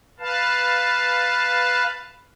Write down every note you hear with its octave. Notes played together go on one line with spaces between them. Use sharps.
B4 F5 A5